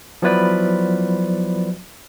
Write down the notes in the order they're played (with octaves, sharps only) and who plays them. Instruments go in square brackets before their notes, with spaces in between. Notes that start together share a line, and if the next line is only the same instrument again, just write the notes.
[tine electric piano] F3 F#3 B3 E4 B4 D5